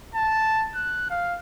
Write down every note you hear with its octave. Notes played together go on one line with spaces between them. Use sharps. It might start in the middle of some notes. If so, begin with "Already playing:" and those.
A5
F#6
F5